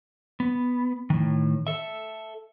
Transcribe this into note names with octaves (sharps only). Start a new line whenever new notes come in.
B3
A2 D#3
A4 E5